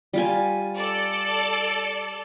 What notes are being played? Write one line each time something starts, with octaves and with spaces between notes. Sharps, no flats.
G3 F4 G#5
A4 D5